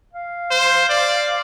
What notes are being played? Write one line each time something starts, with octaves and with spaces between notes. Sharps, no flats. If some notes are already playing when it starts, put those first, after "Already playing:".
F5
C5
D5